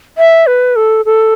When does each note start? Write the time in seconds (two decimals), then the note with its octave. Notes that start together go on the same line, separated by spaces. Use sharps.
0.18 E5
0.47 B4
0.76 A4
1.05 A4